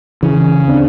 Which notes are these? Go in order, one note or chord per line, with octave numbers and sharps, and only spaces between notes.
C#3 E3
D2 C4 D4